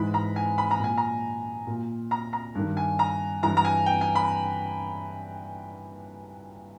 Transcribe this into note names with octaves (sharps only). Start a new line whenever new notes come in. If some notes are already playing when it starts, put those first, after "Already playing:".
Already playing: G#2 E3 B5
A#5
G#5
B5
A#5
A#2 G#5
A#5
A#2
A#5
A#5
G2 D#3
G#5
A#5
G2 E3 A#5
A#5
G#5
G5
G#5
B5